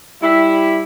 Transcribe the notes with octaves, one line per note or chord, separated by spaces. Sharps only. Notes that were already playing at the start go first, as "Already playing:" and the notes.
G3 E4